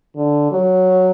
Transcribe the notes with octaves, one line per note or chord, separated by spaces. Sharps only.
D3
F#3